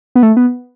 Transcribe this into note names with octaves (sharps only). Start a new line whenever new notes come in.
B3
A3
B3